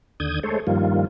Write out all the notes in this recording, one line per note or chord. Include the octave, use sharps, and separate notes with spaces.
D#2 D3 D#6 G6 G#6
G#3 A3 A4 C5 C#5
G2 D#3 F3 G3 A#3 F4